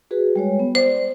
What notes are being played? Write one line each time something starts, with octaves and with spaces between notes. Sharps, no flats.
F#4 G#4 B4
G3 G#3 C#5
B3
C5 D5